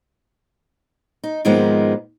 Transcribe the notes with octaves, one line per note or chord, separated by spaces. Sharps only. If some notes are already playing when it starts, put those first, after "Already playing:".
D#4
G#2 D#3 F3 G#3 A#3 B3